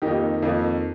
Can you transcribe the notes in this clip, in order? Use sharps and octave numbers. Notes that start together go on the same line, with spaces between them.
F2 D#3 A#3 D#4 G4
F2 D#3 A#3